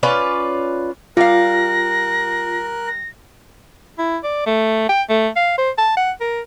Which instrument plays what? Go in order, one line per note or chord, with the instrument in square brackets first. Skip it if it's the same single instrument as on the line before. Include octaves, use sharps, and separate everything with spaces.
[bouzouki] C#4 F4 B4 D5
[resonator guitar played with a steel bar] G3 F5 [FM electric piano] F4 [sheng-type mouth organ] A#4 F#6 [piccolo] A#6
[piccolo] A#6
[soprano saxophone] E4
D5
A3
G5
A3
F5
C5
A5
F#5
A#4